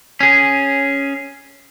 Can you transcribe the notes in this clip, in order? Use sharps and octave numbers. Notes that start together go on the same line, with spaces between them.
C#4 G#4